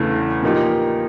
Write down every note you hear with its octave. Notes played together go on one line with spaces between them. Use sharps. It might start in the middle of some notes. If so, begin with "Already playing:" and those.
Already playing: E2 C#3 E3 A3 D4
A#2 F3 A#3 D#4 G4